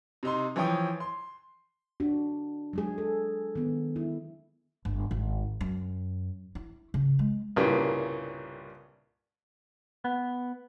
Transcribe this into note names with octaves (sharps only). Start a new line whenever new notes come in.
C3 D#4 C6
E3 F3 C#5 G5 D#6
C6
D4 F#4
F#3 G#3 G#4
A4
D#3 B3
E4
G1
G#1
F#2
E4
C#3
G#3
C2 G2 A#2 C#3 A#3
B3